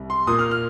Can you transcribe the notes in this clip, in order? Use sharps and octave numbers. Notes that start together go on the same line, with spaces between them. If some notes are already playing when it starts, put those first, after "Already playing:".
Already playing: C2
C6
A#2 A#3 D#6
F6
F6